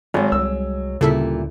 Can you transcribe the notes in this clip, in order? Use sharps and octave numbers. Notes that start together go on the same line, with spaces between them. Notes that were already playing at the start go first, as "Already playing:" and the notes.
G#1 F#3 G#3
C2 G3 E6
D2 A#2 C#3 G3 E4 A4 E5